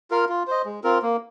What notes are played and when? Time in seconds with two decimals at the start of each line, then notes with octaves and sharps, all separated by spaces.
0.11 F4 A#4 F5
0.29 F4
0.47 C5 D#5
0.65 G#3
0.84 C4 F4 A#4
1.02 A#3